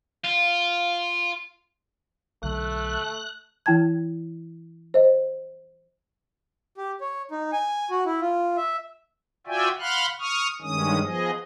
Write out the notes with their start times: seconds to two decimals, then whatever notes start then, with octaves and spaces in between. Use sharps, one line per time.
0.24 F4
2.43 B1 D3 A3 F#6
3.66 E3 E4 G5 A5 G#6
4.94 C5 D#5
6.77 G4
7.01 C#5
7.31 D#4
7.52 G#5
7.91 F#4
8.06 E4
8.21 F4
8.57 E5
9.47 F4 F#4 D5 E5 G5 G#5
9.80 F5 F#5 B5 C6 F6 F#6
10.19 C#6 D#6 F6
10.62 G2 D#3 G#3 C#4 D#6
11.03 F3 B3 G#4 D#5